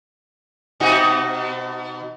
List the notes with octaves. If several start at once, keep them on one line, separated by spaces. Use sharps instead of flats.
B2 D#4 F#4